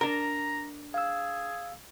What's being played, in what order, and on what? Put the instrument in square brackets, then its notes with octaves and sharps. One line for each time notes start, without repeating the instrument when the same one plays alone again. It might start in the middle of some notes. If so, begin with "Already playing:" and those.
[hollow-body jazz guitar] D4 A#4 [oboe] A#5
[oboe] G#4 [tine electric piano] F5 E6